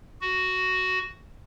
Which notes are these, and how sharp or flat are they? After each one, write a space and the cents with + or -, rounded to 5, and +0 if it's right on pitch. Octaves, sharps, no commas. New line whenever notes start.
F#4 +5